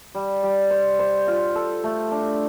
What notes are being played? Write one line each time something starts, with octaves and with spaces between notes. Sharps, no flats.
G3
G3
C5
C5
F4
A4
A3
D4